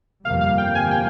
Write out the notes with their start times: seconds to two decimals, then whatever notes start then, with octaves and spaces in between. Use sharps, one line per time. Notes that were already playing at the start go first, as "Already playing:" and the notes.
0.24 G1 F2 C3 G3 A#3 F5
0.41 F5
0.58 G5
0.75 G#5
0.91 G5